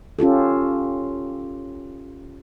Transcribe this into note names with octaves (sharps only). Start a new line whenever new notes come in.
C#4 F4 G4 A4